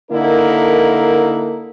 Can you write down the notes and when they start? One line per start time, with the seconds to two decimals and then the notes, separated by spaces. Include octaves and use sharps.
0.12 D3 A#3 D#4 E4 A4 A#4